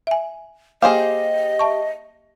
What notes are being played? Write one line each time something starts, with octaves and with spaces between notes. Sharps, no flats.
E5 G#5
A#3 G4 G#4 C5 D#5 F5
E5 A5 C#6